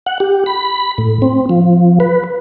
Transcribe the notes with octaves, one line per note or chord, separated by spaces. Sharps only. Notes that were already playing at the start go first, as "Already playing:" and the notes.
F#5
G4
B5
A2
C4
F3
B4